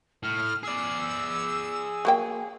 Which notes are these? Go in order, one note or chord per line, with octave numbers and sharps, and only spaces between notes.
A2 F6
G#4 D5 E6
F#3 A#3 G5